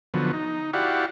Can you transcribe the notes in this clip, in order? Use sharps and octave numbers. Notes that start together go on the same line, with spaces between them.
D3 F3 F#3 B3
D#4
E4 F#4 G4 D5 F5 F#5